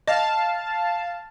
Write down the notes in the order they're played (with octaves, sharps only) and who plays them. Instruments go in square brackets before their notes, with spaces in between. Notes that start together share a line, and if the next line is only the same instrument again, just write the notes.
[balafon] D#5 [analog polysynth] F5 A5